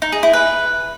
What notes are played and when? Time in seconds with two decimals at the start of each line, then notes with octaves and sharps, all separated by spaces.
0.02 D#4
0.12 G#4
0.23 E4
0.33 B4